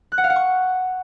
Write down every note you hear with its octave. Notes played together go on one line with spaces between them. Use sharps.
F#6
F#5
F5
F#5
C#6